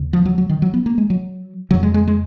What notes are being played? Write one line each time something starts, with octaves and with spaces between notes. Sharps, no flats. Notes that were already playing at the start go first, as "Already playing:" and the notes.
Already playing: D#2 C#3
F3
F#3
F#3
D#3
F#3
B3
A#3
G#3
F#3
F2 C#3 F#3
G#3
G#3
G#3